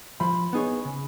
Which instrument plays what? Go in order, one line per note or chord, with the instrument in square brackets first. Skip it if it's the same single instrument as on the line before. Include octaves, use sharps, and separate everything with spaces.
[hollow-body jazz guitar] F3 [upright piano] B5
[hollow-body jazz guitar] B3 D#4 G#4 C#5
C#3